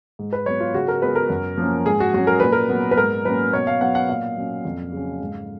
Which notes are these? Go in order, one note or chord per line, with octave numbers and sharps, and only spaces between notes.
G#2
B4
F#3 B3 C#5
F4
C#3 F#4
A#4
G#3 B3 B4
A#4
F#2
F3 A#3 C#4
G#2 G#4
F#4
F#3 C#4 F#4
A#4
A#2 B4
A#4
F#3 B3
B4
G#2 A#4
F#3 A#3 C#4 B4
B2 C#5
F5
F#3 B3 F#5
F#5
A#2 F5
F#3 C#4
F2
C#3 F#3 C#4
G#2